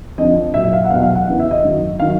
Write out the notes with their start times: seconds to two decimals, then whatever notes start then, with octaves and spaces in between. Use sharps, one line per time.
0.18 F2 D3 F3 D#5
0.54 A#2 F#3 E5
0.64 E5
0.73 F5
0.85 F#5
0.90 E2 B2 F#3 F5
1.03 F5
1.15 F#5
1.27 E2 C#3 E3
1.40 E5
1.51 D#5
1.64 F#2 D#3 F#3
1.99 D#3 F#3 F5